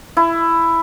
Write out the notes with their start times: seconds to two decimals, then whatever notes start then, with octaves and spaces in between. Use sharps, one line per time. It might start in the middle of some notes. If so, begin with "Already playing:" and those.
0.17 E4